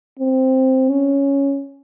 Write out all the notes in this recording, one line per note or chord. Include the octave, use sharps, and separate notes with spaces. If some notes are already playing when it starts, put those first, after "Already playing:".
C4
C#4